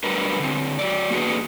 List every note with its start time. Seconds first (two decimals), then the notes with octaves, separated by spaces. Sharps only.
0.04 F#3 G3 D4 A#4 B4
0.39 D3 C4
0.79 F#3 D5
1.11 A#3 D4 F#4 G#4 B4